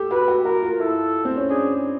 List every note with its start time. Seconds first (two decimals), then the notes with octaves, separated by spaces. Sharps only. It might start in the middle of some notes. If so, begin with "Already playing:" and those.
Already playing: G4 A4
0.11 F#4 B4
0.28 F#4
0.45 F#4 A#4
0.62 F4
0.80 E4 A4
1.25 C4
1.37 C#4
1.50 D4 G#4